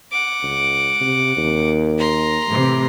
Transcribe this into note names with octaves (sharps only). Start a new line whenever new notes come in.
F#5 D6
C#2
C3
D#2
A#5 C6
A2 C3 E3